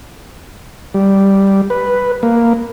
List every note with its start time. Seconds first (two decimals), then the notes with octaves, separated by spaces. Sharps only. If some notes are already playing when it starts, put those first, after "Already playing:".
0.94 G3
1.70 B4
2.23 A#3